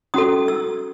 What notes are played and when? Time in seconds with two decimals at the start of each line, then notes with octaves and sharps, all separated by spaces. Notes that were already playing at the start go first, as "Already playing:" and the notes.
0.14 C#4 F#4 A4 D#6
0.48 E6